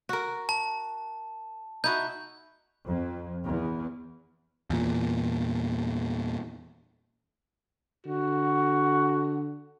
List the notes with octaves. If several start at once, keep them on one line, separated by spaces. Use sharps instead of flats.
F#4 A#4
A5
D#4 E4 F#4 G6
F2
E2
E2 A#2
D3 F#4